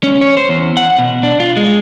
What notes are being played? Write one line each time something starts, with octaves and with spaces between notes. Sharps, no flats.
C#4
C#5
C5
E2
F#5
B2
D4
F4
G#3